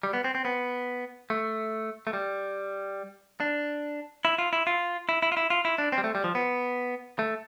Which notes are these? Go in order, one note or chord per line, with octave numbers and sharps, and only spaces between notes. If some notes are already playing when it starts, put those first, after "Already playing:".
G3
B3
C4
C4
B3
A3
A3
G3
D4
E4
F4
E4
F4
E4
E4
F4
E4
F4
E4
D4
C4
G3
A3
G3
F3
B3
A3